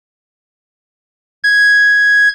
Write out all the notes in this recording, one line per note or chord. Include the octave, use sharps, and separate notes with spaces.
G#6